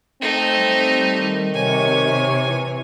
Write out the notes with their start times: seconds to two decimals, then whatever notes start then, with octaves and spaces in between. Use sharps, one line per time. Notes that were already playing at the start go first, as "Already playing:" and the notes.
0.22 A3 C4 D#4
0.57 G3
1.21 D#3
1.55 C3 C#5 G#5
2.46 E3